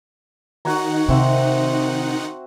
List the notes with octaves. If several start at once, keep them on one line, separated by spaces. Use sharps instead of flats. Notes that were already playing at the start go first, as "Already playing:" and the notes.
D#3 D#4 F#4 C#5 F#5 A#5
C3 C4 E5 C6